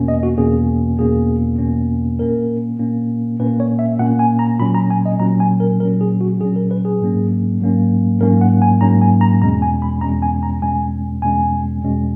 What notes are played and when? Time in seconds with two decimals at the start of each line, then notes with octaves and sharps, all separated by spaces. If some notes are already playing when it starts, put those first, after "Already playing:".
Already playing: E2 B2 A#3 C#4
0.08 D#5
0.23 F#4
0.37 E2 B2 A#3 C#4 G#4
0.98 E2 B2 A#3 C#4 G#4
1.59 E2 B2 A#3 C#4
2.19 A#2 A#3 C#4 A#4
2.79 A#2 A#3 C#4
3.40 A#2 A#3 C#4 B4
3.60 C#5
3.79 E5
3.99 A#2 A#3 C#4 F#5
4.19 G#5
4.39 A#5
4.59 A#2 F#3 C#4 B5
4.75 A#5
4.90 G#5
5.06 D#5
5.19 A#2 F#3 C#4 A#5
5.40 G#5
5.60 A#4
5.80 A#2 F#3 C#4 A#4
6.01 G#4
6.21 F#4
6.40 A#2 G#4
6.43 F#3 C#4
6.56 A#4
6.71 B4
6.85 G#4
7.01 G#2 F#3 A#3 C#4
7.61 G#2 F#3 A#3 C#4
8.21 G#2 F#3 A#3 C#4 A#4
8.41 F#5
8.62 G#5
8.81 G#2 F#3 A#3 C#4 A#5
9.02 G#5
9.21 A#5
9.42 E2 B2 G#3 C#4 A#5
9.62 G#5
9.82 B5
10.01 E2 B2 G#3 C#4 A#5
10.22 G#5
10.43 A#5
10.62 E2 B2 G#3 C#4 G#5
11.22 E2 B2 G#3 C#4 G#5
11.83 E2 B2 G#3 C#4